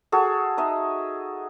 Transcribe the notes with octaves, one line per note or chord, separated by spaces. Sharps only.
F#4 G#4 A4
D#4 D#5 E5